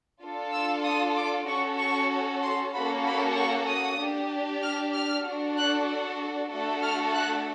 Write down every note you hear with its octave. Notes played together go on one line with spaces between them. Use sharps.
D4 F4 A4
E6
D#6
D6
C#4 F#4 A4 C#6
C#6
C6
A#3 C#4 F#4 A4 B5
B5
C#6
D#6
D4 G4
F6
F6
D4 F#4 A4
F#6
A3 D4 F#4 A4
F6
F#6